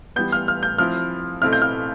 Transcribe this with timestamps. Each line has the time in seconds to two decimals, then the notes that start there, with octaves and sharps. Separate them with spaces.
0.16 E3 G3 B3 G6
0.32 F6
0.48 F6
0.63 G6
0.78 F3 C4 E4 F6
1.42 B2 A3 C4 E4 F6
1.53 G6
1.62 F6